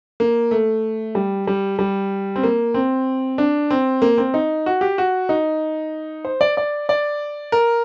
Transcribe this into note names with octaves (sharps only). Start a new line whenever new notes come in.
A#3
A3
G3
G3
G3
C4
A#3
C4
D4
C4
A#3
C4
D#4
F#4
G4
F#4
D#4
C5
D5
D5
D5
A#4